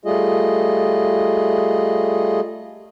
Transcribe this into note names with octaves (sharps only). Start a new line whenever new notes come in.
G3 A3 F4 G#4 D#5